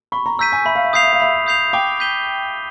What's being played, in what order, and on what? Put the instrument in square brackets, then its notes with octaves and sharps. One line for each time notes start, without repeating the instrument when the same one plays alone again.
[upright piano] B5 [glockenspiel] C#6
[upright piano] A#5
[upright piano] A#5 [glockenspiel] E6 G6 B6 D#7
[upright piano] G#5
[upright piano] E5 [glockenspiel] B5
[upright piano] F5
E5
[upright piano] F5 [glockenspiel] D#6 G6 C7 F7
[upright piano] E5
F5
[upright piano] E5 [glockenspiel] B5
[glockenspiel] D#6 G6 C7 F7
[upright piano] G5 [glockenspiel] D6
[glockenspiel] G6 B6 D#7 G7